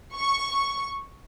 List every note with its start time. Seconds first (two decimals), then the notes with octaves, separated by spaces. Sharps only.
0.15 C#6